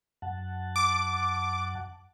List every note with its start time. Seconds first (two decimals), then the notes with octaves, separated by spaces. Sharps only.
0.22 F#2 F#5 A5
0.76 D6